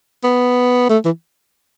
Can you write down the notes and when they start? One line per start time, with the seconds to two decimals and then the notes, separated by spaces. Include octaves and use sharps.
0.23 B3
0.89 A3
1.05 E3